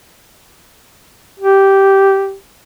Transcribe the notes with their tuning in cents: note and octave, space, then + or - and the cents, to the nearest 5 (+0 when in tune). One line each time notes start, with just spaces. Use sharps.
G4 -10